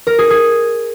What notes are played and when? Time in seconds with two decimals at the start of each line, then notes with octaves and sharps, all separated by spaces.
0.07 A#4
0.19 G#4
0.30 G#4